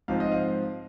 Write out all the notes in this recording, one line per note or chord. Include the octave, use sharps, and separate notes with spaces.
G#2 F3 C4 F5
D#5
F5